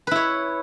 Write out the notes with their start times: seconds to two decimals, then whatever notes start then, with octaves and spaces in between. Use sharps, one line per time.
0.07 B4
0.11 E4
0.16 C#5